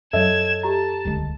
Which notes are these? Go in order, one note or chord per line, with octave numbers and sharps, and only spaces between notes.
F#2 F#3 A4 C#5 D#5 E5 G#6 E7
G4 A5 A#5
D#1 C#2 D3 G#3